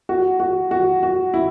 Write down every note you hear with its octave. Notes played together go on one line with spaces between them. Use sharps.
F#4
F#4
F#4
F#4
E4